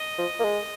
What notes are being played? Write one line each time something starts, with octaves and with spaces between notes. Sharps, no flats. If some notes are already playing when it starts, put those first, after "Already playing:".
Already playing: D#5
F3
A#3
G#3